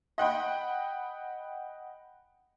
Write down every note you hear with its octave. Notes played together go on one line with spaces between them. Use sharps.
D#5 F#5 G5 B5